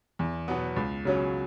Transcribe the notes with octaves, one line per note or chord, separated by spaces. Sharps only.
E2
B2 F#3 B3
C#2
C#3 F#3 C#4